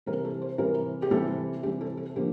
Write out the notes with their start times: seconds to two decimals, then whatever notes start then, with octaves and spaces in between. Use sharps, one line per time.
0.06 C3 E3 G3 A#4
0.25 A4
0.42 C5
0.58 C3 E3 G3 A#4
1.02 G4
1.10 C3 E3 G3 A4
1.63 C3 E3 G3 G4
1.81 A4
1.97 A4
2.16 D3 F3 A#3 G4